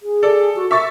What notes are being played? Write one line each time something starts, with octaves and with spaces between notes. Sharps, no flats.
G#4
A4 D5
F#4
A#4 E5 C#6 A6